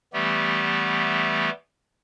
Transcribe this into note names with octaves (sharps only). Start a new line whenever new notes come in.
E3 G3 A3 B3 G4